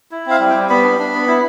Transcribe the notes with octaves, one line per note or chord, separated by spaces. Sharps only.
E4
C4 F5
G3
G5
G3
B3 B5
D4
D4
B3
E4